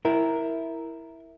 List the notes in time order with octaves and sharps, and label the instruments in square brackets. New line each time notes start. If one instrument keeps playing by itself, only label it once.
[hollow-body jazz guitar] E4 A#4